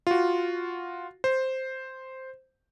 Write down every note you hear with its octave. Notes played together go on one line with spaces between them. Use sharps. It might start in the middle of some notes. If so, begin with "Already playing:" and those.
F4 F#4
C5